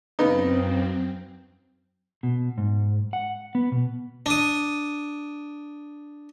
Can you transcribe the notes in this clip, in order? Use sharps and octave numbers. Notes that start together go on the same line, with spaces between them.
F#2 C#3 B3 C4 D#4
B2
G#2
F#5
B3
B2
D4 D#6